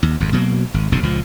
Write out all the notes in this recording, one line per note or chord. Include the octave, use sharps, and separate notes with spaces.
D#2
G#1 F2
B2 F#3 G3 A#3
G#1
E1 B1 G#2 C#3
C#2 A#2 F3